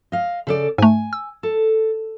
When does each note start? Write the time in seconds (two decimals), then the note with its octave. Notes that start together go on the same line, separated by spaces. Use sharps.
0.12 D#5 F5
0.47 C#3 A4 D5
0.78 G#2 A3 G#5
1.13 E6
1.43 A4